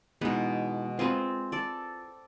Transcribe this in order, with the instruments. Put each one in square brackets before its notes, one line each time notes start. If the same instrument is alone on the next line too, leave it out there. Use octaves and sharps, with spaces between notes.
[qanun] B2 G#3 [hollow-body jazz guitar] E3 B3 D#4
[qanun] C4 [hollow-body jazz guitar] F4 G#4 B4
[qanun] A4 D5